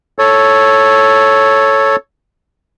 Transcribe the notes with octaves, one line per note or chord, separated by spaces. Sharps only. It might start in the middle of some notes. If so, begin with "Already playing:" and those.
A4 C#5